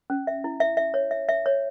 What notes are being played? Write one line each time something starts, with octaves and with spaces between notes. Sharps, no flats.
C#4
E5
E4
E5
E5
C#5
E5
E5
C#5